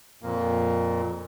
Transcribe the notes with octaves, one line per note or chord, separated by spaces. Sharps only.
F2 A#2 A#3